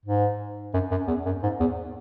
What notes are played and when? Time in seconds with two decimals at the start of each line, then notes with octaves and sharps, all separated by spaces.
0.05 G#2
0.74 F#2
0.91 F#2
1.07 E2
1.25 F#2
1.43 G#2
1.60 E2